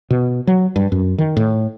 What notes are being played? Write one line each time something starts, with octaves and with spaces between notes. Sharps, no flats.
B2
F#3
G2
F#2
D#3
A2